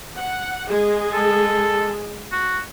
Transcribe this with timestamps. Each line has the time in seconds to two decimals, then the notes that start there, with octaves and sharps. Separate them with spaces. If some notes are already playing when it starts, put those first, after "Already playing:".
0.20 F#5
0.69 G#3 G#4
1.13 A4
2.32 F#4